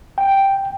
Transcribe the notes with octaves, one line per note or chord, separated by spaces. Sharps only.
G5